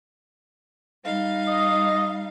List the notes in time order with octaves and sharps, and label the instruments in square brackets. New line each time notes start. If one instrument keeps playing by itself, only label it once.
[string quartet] G3 D#4 F5
[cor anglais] D#5